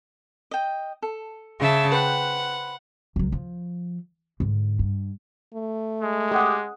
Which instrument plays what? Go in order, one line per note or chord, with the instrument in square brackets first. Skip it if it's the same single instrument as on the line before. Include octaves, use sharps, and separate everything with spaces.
[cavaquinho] D#5 G5
A4
[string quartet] C#3 E5 A5
[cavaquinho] B4 C5 G5 [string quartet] F#5
[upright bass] C#2 F#3
F3
G#2 D3
G2
[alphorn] A3
[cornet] G#3
[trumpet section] G4 [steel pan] G#4 F#5